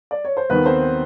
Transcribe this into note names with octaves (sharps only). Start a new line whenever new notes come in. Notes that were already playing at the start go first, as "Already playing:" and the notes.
D5
C#5
C5
D#2 D#3 B3 B4
C4 C5